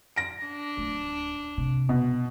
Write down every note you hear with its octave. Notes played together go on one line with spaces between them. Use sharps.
A#6 D7
D4
D1 G#3
C3
E1 B2